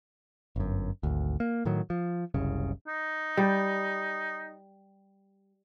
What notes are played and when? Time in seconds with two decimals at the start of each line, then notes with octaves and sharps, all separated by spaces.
0.56 G1 F#2
1.03 G#1 D2
1.40 A#3
1.65 A2 D#3 F#3
1.90 F3
2.34 F#1 C2 C#3
2.87 D#4
3.37 G3